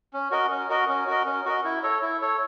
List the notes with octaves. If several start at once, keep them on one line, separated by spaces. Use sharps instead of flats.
C#4
F#4 A#4 D#5
C#4
F#4 A#4 D#5
C#4
F#4 A#4 D#5
C#4
F#4 A#4 D#5
E4
A4 C#5
E4
A4 C#5